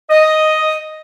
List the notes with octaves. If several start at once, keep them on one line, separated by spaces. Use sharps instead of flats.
D#5